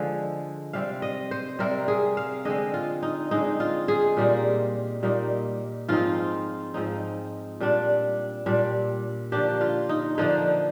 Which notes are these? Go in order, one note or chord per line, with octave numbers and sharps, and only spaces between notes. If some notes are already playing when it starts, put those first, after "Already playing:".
Already playing: D3 F3 G#3
C3 G3 C4 F5
D#5
C5
C3 G3 C4 A#4
G#4
F5
D3 G#3 C4 D#5
F4
D#4
D3 G#3 C4 D#4
F4
G#4
A#2 G3 A#3 D#4
A#2 G3 A#3 D#4
G#2 F3 C4 D#4 F4
G#2 F3 C4 D#4
A#2 G3 D4
A#2 G3 D4
D3 F3 A#3 D4 G4
F4
D#4
D3 F3 A#3 D4 D#4